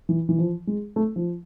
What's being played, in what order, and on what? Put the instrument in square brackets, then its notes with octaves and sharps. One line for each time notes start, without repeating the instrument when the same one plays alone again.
[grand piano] E3
E3
F3
G#3
A3
F3